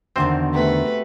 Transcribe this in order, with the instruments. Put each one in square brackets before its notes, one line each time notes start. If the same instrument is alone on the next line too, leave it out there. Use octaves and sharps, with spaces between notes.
[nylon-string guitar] E2 D3 D#3 [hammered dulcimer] B2 [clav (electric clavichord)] C4 C5
[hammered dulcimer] C3 [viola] A3 B4